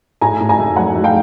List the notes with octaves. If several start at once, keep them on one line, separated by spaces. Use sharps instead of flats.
A2 G#5 A#5
A2
G#5 A#5
A3
F#3 F#5 G#5
A3
F5 G5